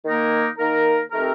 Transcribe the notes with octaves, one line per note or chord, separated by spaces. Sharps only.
D#3 A#3 D#4 A#4
D#3 A#3 D#4 A#4
D#3 A3 C4 G4 A#4